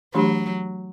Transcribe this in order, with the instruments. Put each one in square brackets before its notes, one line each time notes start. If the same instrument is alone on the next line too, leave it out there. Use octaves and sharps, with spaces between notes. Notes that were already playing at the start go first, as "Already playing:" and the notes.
[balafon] E3 A3 D4 G4 [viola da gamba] F#3